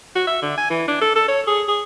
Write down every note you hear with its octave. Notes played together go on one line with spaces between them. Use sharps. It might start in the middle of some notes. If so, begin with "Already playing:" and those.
F#4
E5
D3
G#5
E3
D4
A4
A4
C#5
G#4
G#4